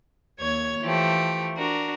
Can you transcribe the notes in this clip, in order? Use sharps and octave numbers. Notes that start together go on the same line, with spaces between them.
D#2 C#5 G#6
E3 F3 A3 G4
D4 F#4 A#4